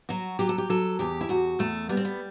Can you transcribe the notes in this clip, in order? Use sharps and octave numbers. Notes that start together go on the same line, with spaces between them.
F#3 F#4
F#3 G4
A4
G4
F#3 A4
E2 G4
E4
E2 F#4
E2 A3
G3 B3
C4
B3